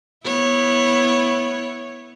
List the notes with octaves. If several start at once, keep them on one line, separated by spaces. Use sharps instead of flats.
B3 E4 C#5